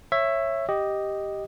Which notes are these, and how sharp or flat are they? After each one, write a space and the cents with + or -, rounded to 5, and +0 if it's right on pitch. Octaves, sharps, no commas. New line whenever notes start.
C#5 -15 E5 +10
G4 +0 D#5 +0